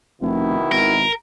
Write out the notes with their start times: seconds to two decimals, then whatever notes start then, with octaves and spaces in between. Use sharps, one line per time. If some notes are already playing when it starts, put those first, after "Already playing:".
0.21 F1 B2 D#3 E4
0.72 G#1 A#4